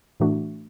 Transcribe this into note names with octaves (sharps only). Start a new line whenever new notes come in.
A2 E3 A3 D4 F#4